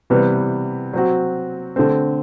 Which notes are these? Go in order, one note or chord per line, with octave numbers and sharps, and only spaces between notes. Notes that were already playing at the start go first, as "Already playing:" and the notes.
C3 E3 G3 B3
F#3 C4 F#4
D3 A3 C4